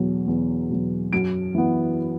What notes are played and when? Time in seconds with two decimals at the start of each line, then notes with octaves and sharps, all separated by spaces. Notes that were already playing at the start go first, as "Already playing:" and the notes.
Already playing: E2 B2 F#3
0.27 E2
0.70 B2 F#3
1.13 F#2 D7
1.55 E3 B3